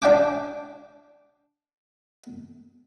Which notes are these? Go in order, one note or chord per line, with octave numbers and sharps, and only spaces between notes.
D4 D5 F5 G5 G#5 D6